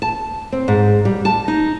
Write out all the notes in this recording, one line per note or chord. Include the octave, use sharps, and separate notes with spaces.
A5
C4
G#2
G3
A5
D#4